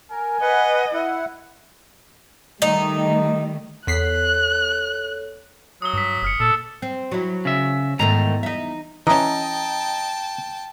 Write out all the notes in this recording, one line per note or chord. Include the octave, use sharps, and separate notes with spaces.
A#4 G#5
B4 D#5 F#5
E4 F#5
D#3 G3 A3 D#4
E2 A4 C#5 F#6 B6 C7
F#3 D#6 G7
G2 D6 B6
F1 D#6 F6 C#7
A#2 A4
C4
F#3 E4
C#3 E5
E2 G#2 D#3 A3 A#5
D#4 E5
E3 C#4 D#5 G5 A5 A#5